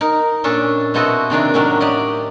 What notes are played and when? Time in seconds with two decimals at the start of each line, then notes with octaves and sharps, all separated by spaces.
0.01 D#4 A#4
0.44 A#2 C#4 D4 A4
0.94 B2 C4 E4 F#4 A4 D#5
1.30 C3 D#3 D4 G#4
1.54 A2 D#3 F#3 C#4 D4 A#4
1.81 G4 D5 D#5